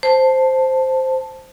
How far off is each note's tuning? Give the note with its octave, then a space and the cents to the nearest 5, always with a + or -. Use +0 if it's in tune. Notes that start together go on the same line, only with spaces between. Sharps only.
C5 +0 A5 +0